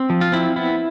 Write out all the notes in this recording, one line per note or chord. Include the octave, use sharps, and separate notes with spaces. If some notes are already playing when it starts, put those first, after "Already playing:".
Already playing: C4
F3
F4
C4 E4
B3 E4